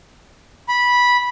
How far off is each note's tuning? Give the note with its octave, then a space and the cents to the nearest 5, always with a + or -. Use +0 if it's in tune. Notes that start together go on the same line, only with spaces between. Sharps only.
B5 -10